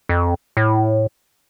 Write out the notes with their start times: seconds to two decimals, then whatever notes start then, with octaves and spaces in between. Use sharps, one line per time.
0.09 F2
0.57 A2